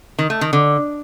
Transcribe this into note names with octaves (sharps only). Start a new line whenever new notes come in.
D#3
A3
D#3
D3